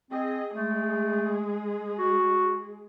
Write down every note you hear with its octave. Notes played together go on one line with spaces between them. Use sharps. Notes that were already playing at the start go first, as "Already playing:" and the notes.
C4 G#4 D#5
G#3 A3 G#4
F#4